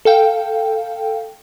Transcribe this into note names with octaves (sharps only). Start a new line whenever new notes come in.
A4 F5 G5